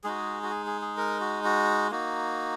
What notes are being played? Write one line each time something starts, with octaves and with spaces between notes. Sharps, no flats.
G#3 D#4 F#4 G#4
F#4
G#4
G#4
G#4
A#4
F#4
F#4
A#3 D#4 F#4